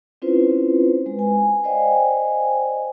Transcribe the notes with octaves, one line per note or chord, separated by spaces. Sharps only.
C4 C#4 E4 F4 B4 C5
G#3 B4
G#5
C5 D5 D#5 F5 G5 G#5